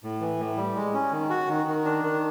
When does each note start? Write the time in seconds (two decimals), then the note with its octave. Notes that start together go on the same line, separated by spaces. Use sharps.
0.03 A2
0.21 E3
0.40 A2
0.57 G3
0.76 G#3
0.94 C#4
1.12 D#3
1.30 F#4
1.49 D#3
1.67 D#3
1.85 D4
2.04 D#3